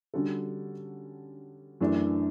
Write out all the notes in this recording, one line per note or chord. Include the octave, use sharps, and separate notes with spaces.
D3 G3 C#4 F#4 A4
F#2 E3 A3 D4